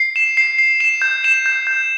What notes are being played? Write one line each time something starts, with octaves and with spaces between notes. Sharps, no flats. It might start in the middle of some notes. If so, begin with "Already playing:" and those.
Already playing: C7
E7
C7
C7
E7
G6
E7
G6
G6